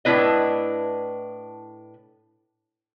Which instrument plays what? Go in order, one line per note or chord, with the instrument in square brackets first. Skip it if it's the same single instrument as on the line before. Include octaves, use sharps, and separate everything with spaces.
[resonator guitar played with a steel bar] A2 D4 E4 B4 D#5